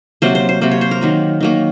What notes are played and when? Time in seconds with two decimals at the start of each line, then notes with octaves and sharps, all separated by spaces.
0.22 C3 F#3 A#3 C5
0.35 C5
0.49 C5
0.61 C3 F#3 A#3 C5
0.71 C#5
0.81 C5
0.91 A#4
1.01 D#3 F#3 A#3
1.41 D#3 F#3 A#3